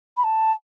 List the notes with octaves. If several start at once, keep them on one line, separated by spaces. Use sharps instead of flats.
B5
A5